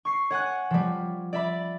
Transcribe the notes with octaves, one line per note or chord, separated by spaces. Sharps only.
C#6 C7
C#5 F#5 G#5 F#6
F3 G3
D5 E5 B5